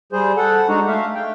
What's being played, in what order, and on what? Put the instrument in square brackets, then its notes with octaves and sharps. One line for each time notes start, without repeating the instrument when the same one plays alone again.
[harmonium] G3 G#4 C5
A4 F#5
G#3 D4 D#4 F#4
A3 E5 F5
G5